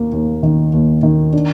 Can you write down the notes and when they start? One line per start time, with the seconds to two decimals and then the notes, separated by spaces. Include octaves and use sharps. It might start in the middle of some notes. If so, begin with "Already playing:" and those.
Already playing: D#2 A#3
0.13 D#2
0.43 D#3
0.73 D#2
1.03 D#3
1.33 D4